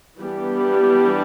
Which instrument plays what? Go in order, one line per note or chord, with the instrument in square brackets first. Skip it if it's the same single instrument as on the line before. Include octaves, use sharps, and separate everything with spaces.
[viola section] E3 G3 B3 D4 G4